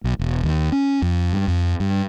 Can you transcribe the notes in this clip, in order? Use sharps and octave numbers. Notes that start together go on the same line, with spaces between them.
B1
E1
D#2
C#4
F2
G2
F2
G2